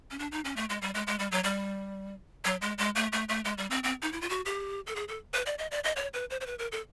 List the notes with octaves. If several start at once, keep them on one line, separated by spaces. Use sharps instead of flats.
C#4
D4
D#4
C#4
A3
G#3
G3
G#3
G#3
G3
F#3
G3
F#3
G#3
G#3
A3
A3
A3
G#3
G3
C4
C4
D#4
E4
F4
F#4
G4
A4
G#4
A4
B4
D5
D#5
D5
D#5
C#5
B4
C5
C5
B4
A#4
A4